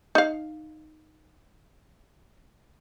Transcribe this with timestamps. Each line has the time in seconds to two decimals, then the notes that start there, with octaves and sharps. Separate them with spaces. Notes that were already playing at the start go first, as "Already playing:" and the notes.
0.15 D#4 F5